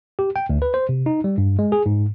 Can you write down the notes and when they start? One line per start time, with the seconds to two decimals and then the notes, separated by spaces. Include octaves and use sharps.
0.19 G4
0.36 G5
0.49 D2
0.62 B4
0.74 C5
0.89 C3
1.06 D#4
1.24 G3
1.38 G2
1.59 G#3
1.72 G#4
1.86 G#2